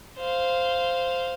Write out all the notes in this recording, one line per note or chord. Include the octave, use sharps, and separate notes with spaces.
C5 F5